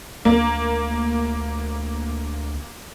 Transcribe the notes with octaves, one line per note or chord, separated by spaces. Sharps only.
D2 A#3